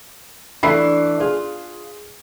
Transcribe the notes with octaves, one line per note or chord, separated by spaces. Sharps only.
E3 A3 D4 B5 C7
F4 G#4